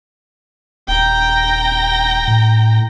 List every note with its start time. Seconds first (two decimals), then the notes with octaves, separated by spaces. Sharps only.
0.88 D#1 G5 A#5
2.27 A2